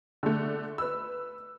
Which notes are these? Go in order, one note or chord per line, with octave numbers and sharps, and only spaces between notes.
D3 A3
B4 E6